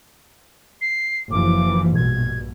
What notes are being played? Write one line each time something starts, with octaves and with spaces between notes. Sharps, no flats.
C7
F#1 E3 F3 D6
A#1 G2 B2 G#6